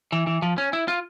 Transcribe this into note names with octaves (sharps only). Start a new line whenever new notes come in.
E3
E3
F3
C#4
E4
F4